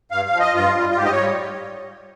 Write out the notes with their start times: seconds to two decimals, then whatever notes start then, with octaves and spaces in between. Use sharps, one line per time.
0.11 G2 F5
0.25 F5
0.33 F3
0.40 D#5
0.54 G2 F4
0.76 G3
0.90 F4
0.97 G#2 G4
1.05 D#5
1.12 C#5
1.19 G3